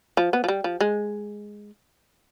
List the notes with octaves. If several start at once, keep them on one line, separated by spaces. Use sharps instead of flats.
F3
B3
F3
G3
F3
G#3